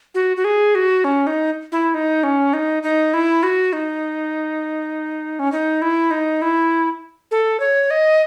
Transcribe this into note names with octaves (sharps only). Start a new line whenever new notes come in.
F#4
F#4
G#4
F#4
C#4
D#4
E4
D#4
C#4
D#4
D#4
E4
F#4
D#4
C#4
D#4
E4
D#4
E4
A4
C#5
D#5